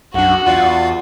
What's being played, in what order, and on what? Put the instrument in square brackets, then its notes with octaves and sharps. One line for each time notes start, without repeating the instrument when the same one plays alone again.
[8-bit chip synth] B1 D4 [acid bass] F#2 [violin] F#4 [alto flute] F#5
[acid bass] E2 [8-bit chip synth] F4 D5 F5